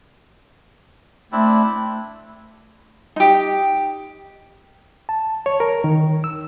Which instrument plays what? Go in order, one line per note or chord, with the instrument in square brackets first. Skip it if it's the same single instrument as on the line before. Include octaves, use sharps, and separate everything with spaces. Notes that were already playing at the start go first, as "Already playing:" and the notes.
[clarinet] A3 [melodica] C4 D4 E4
[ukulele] D#4 G4
[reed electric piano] A5
C#5
A#4
D#3
E6